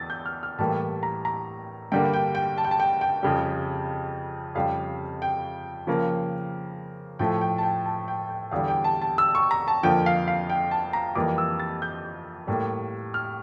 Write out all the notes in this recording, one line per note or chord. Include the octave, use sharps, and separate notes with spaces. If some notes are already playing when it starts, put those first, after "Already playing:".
Already playing: E2 E3 A6
G6
F6
F6
A2 E3 G3 A#3 A5
A#5
A#5
G2 D3 G3 A#3 G5
G5
G5
A5
G5
A5
G5
G5
F2 C#3 G3
F2 C#3 G3 F5
G5
C#3 F3 A#3
A2 F3 A3 G5
G5
A5
G5
A5
G5
G5
E2 D3 G3 F5
G5
A5
A5
E6
C#6
A#5
A5
F2 D3 F3 A#3 G5
F5
F5
G5
A5
A#5
F2 E3 G3 A#3 D6
E6
A6
G6
A2 G3 A#3
F6